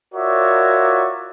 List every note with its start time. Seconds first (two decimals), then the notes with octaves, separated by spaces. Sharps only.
0.15 F4 F#4 A#4 C#5 D5 E5